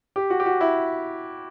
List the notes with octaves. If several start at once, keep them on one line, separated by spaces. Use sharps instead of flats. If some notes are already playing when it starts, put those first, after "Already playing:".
G4
F#4
G4
F#4
E4